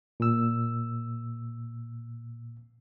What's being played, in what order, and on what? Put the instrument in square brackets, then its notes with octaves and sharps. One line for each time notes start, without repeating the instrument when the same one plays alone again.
[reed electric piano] A#2 E6